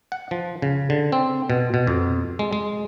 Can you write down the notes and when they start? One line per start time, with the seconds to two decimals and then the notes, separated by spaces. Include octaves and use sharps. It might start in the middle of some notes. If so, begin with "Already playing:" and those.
0.12 F#5
0.31 F3
0.62 C#3
0.90 D3
1.12 C4
1.50 B2
1.74 B2
1.87 F2
2.39 G#3
2.53 G#3